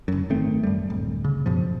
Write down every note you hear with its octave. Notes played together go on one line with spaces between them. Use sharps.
F#1 F#2
G#1 D#3 A3 C4
F#2 G3
D1
C#3
F#2 B2 F3